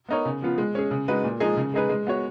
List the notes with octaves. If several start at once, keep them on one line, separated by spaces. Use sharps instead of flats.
B3 D#4 A#4 C#5
C#3
F3 B3 F4
G#3
C#4 G#4
C#3
G#3 D#4 F#4 B4
A#2
F3 G#3 D#4 G#4
C#3
G#3 D#4 G#4 B4
G#3
B3 F#4 C#5